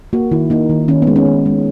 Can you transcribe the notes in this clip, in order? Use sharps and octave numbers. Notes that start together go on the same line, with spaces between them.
A#3 F#4
D#3 E4
A#3 D#4
D#3
D#3 C#4
B3
G#3
C#4
D#3
G#3